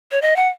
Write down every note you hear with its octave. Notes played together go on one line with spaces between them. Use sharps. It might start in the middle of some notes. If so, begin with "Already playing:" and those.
C#5
D#5
F#5